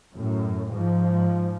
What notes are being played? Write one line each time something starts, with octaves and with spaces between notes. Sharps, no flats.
F#2 A2
G#2 F3